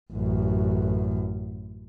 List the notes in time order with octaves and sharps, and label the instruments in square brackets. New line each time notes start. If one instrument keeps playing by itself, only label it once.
[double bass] A1 F#2